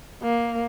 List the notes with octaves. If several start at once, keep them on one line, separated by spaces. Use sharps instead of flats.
A#3